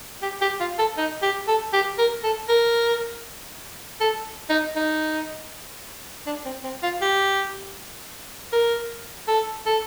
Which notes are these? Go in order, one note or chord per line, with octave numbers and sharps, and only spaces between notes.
G4
G4
F4
A4
D#4
G4
A4
G4
A#4
A4
A#4
A4
D#4
D#4
D4
C4
C4
F4
G4
A#4
A4
A4